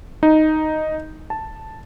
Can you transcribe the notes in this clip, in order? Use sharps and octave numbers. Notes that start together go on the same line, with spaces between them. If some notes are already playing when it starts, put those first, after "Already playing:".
D#4
A5